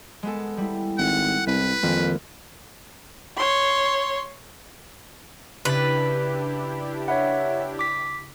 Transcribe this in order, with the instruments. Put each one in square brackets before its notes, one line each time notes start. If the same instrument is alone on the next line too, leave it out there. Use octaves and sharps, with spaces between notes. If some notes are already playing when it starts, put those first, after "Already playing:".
[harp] G#3 B3 A4
G3 E4
[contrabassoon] G#1 [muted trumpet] F#5
[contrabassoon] C2 [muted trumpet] B4
[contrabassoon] F2 [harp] D#3 G#3 A#3
[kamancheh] C#5 C6
[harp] C#3 A6 [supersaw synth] D4 E4 G4 [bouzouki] B4
[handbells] C#5 E5 F#5 [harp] B5
[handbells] D6 B6